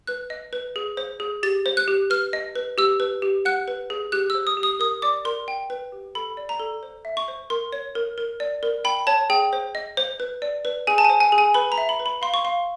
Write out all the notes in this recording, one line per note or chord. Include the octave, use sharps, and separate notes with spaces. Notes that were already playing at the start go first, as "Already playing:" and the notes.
B4 F#6
D#5
B4
G#4
C5
G#4
G4 A6
C5
F#6
G4
B4 F6
D#5
B4
G4 E6
B4
G4
F#5 F#6
B4
G#4
G4 F#6
E6
C5
D#6
G4
D#6
A#4 D#6
D5 D6
A#4 C6
G5
B4
G4
A4 B5
D5
A#5
A4
C5
E5
C#6
C5
A#4 C6
C#5
A#4
A#4
D5
A#4
G5 B5
C#5 A5
G#4 G5
C5
D#5
C5
B4
D5
B4
G#4 G#5
A5
C5 G#5
G#5
G#4
G#5
B4 B5
A#5
E5
B5
B4
B5
F5 C6
C#6
F5 C6